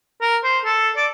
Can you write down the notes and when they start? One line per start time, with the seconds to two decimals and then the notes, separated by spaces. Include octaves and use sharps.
0.21 A#4
0.44 C5
0.65 A4
0.97 D5